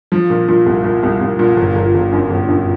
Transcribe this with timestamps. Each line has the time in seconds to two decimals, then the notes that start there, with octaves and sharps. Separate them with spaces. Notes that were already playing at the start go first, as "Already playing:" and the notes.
0.12 F3
0.30 A#2
0.48 A#2
0.66 C2
0.84 A#2
1.03 C2
1.21 C2
1.39 A#2
1.57 G1
1.76 G1
1.94 G1
2.12 F#2
2.30 G1
2.48 F#2